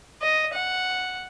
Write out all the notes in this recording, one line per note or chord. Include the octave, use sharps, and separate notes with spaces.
D#5
F#5